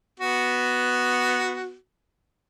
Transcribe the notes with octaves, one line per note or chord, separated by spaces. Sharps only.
B3 F#4